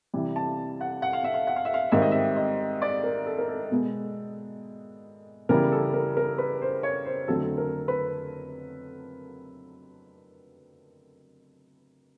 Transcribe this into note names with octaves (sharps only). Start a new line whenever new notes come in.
C3 E3 G3
A5
F#5
F#5
F5
E5
F5
F#5
F5
E5
F5
G#2 D#3 G3 C4 E5
D#5
E5
D#5
D5
A#4
A4
A#4
A4
B2 G#3 B3
C#3 E3 G3 B3 A#4
A4
A#4
A#4
B4
C5
C#5
C5
F2 D3 F#3 A3 C4 A4
A#4
B4